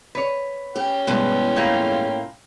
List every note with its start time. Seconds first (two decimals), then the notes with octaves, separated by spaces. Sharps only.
0.15 B4 C#5
0.76 C#4 G4 G5
1.07 E2 G2 B2 G#3
1.56 A2 A#3 F4